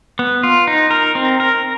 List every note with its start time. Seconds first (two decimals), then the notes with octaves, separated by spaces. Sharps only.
0.19 B3
0.43 F4
0.67 D#4
0.91 A#4
1.15 C4
1.40 A#4